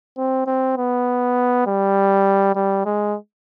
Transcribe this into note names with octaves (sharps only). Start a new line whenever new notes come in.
C4
C4
B3
G3
G3
G#3